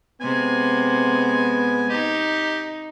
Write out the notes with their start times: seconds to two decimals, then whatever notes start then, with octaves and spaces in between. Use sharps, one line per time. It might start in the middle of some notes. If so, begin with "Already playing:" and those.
0.21 C3 G#3 B3 G#5
1.90 D#4 G4